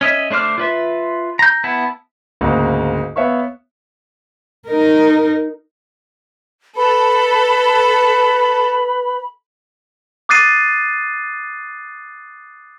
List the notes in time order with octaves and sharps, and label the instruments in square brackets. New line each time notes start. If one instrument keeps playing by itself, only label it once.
[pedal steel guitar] C#4 D#5 E5
A3 D4 C5 D6 F6
F4 B4 E5
A#5 G6
B3 E4 A5
[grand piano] D2 G#2 C#3 A#3
B3 C#5 E5 F5 C#6
[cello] D#4 A#4
[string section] A4 [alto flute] B4 [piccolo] B5
[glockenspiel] D6 D#6 F#6 A6 C7 D#7